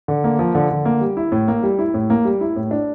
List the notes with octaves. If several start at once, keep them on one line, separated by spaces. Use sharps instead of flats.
D3
A#3
F3
D3
D3
A#3
G3
E4
A2
A#3
G3
E4
A2
A#3
G3
E4
A2
D4